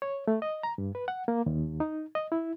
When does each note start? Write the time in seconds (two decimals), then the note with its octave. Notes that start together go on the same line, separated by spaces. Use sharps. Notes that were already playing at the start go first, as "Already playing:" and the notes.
0.02 C#5
0.27 A3
0.42 D#5
0.63 A#5
0.78 G2
0.95 B4
1.08 F#5
1.28 A#3
1.46 D#2
1.80 D#4
2.15 D#5
2.32 E4